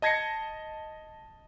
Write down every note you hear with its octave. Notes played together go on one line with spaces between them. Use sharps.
D#5 A5 G#6 A#6 C7 C#7